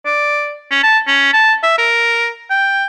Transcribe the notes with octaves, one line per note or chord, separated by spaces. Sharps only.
D5
C#4
A5
C#4
A5
E5
A#4
G5